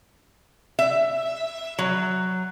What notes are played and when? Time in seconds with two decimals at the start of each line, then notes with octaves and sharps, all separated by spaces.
0.79 E5
1.79 F#3